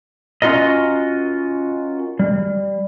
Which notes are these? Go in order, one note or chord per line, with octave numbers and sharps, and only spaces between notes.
C#4 F4 F#4 A#4 D#5
G3